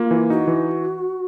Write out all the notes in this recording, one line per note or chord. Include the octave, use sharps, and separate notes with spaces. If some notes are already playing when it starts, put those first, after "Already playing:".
Already playing: A#3 F4
E3
D#4 F#4
E3